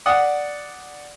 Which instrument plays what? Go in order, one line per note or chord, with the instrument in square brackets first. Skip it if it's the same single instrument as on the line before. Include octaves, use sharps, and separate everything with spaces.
[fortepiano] D5 F#5 D#6